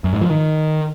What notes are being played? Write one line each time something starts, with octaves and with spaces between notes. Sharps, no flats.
F#2
G#2
F3
D#3